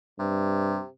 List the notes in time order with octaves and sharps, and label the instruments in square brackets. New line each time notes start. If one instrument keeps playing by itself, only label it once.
[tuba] G2 [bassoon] C3